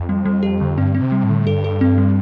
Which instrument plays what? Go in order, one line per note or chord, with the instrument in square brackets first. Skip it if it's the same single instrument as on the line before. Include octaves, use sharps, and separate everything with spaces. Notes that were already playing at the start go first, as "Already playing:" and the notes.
Already playing: [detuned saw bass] F2
[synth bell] G3
G3
G4
D3
[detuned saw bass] G2 [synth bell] C4
[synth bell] C4
[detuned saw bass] C3
[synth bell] G3
[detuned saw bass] A2
[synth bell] D3
[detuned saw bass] G2 [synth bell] A4
[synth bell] A4
C4
G3